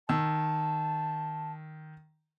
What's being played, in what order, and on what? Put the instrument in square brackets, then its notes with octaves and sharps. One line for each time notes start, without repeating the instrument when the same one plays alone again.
[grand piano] D#3 E6 [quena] A5